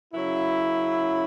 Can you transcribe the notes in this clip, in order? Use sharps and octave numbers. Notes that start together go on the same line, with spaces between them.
F#2 C#3 F#3 E4